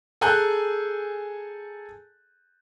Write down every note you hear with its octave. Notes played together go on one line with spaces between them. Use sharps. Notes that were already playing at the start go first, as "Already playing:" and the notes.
G#4 A4 G#5 A#5 F#6 G6